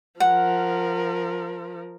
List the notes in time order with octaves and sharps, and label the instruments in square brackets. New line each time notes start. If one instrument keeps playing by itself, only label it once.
[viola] F3 A#4 [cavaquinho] F#5